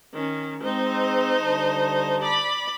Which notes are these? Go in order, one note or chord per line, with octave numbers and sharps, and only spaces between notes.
D#3 C#4
G#3 C4 D#4 C5
D3 G3 A5
D5 B5